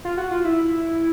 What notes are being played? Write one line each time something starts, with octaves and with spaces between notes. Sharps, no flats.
F4
F#4
F4
E4